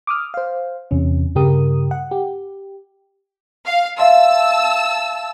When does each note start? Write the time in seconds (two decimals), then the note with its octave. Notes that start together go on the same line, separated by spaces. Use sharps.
0.07 D6 D#6 F6
0.34 C5 F5
0.91 E2 C3 C#4
1.35 G2 C#3 G4 A#4 D#6
1.91 F#5
2.11 G4
3.66 F5
3.98 E5 F5 A5 C6 E6